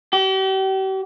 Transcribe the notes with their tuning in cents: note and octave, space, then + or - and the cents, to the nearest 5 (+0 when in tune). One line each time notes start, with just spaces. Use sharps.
G4 -40